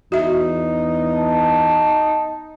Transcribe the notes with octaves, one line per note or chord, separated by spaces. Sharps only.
E2 D#4 F#4 E5
A5